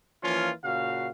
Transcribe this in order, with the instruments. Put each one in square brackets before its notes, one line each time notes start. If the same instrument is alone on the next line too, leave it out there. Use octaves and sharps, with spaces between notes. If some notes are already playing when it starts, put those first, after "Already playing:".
[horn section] E3 F3 A#3 C#4 F4
A#2 C#3 F#4 F5